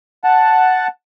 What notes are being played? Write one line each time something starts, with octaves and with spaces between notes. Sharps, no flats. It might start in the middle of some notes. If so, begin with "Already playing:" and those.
F#5 A5